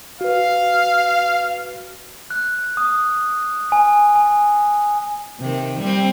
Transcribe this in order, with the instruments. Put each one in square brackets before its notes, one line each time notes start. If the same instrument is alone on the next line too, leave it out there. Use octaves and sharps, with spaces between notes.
[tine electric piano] F#4 B4 [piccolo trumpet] F5
[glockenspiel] F#6
D#6
G#5
G#5
[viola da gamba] C3 D#3
G3 C4